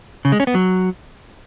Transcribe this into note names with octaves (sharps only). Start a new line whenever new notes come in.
C#3
G#3
C#4
B3
F#3